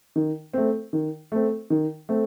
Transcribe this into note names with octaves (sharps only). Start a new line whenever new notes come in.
D#3
A3 C4
D#3
A3 C4
D#3
A3 C4